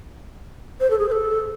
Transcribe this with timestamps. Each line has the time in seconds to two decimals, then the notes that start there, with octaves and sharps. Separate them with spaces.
0.80 C5
0.90 A4
0.99 G#4
1.08 C5
1.12 A4